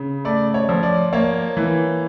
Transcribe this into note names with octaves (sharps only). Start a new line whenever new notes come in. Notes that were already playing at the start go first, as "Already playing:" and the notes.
Already playing: C#3
A3 D5
C#5
F3
D5
A#3 C#5
E3